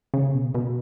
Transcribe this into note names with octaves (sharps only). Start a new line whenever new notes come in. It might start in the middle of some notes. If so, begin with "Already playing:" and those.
C#3
B2
B2